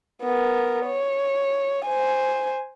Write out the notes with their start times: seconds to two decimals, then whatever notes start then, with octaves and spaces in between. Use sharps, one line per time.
0.22 B3 A#4
0.86 C#5
1.85 C5 G#5